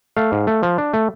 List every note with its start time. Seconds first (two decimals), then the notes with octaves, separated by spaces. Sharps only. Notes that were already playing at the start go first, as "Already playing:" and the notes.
0.17 A3 F5
0.32 G#2
0.47 A3
0.63 F3
0.78 D4
0.94 A3